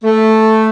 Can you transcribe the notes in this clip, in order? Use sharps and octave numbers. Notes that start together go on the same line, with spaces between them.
A3